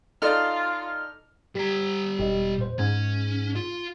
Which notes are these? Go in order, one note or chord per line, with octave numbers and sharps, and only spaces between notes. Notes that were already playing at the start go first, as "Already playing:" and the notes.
D#4 F4 A4 D5 F6
G3 G4 A#5 B6
E1 G4 D#5
A#2 C5
G#2 C#4 G#6
F4